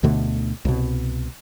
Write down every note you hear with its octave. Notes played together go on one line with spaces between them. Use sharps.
D2 B2 D3 A3
C2 B2